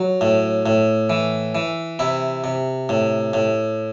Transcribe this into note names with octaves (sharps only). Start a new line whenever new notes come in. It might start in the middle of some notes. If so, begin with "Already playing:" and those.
Already playing: F#3
A2
A2
E3
E3
C3 E4
C3
A2
A2